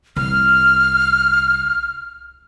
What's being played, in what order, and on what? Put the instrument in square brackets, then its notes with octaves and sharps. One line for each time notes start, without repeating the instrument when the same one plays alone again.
[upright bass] C2 [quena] F6